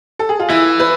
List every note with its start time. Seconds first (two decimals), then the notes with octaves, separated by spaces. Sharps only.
0.19 A4
0.29 G#4
0.39 F4
0.49 E3 E4
0.79 B4